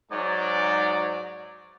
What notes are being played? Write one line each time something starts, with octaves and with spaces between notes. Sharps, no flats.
G#2 F#3 D5